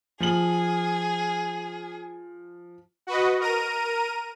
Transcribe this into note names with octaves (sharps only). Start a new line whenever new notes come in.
F3 G#4 F#7
F#4 B4 D#5
A#4 A#5 D#7